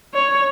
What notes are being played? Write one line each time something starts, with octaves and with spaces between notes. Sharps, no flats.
C#5